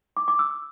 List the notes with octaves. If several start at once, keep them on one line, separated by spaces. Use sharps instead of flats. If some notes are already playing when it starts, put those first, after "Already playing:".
D6
D6
E6